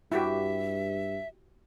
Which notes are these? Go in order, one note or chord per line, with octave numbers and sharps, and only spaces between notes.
G2 E4 F#4 G4 E5